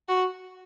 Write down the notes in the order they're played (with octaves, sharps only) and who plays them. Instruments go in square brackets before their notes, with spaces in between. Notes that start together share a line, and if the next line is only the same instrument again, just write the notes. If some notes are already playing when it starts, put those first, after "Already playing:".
[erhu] F#4